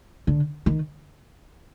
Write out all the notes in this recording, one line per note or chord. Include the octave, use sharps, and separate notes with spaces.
D3
D#3